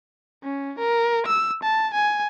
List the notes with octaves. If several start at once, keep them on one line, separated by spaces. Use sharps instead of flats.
C#4
A#4
E6
A5
G#5